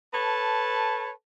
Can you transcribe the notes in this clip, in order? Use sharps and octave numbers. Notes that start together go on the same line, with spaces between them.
A4 B4 C#5 A5